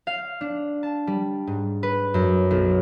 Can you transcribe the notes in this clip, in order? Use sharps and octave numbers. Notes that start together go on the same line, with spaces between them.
F5
D4
A5
G3
G#2
B4
F#2
B1